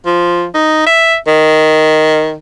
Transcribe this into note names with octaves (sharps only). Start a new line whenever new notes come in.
F3
D#4
E5
D#3